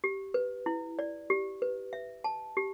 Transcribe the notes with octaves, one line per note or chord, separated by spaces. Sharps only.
G4
B4
E4
D5
G4
B4
E5
A5
G4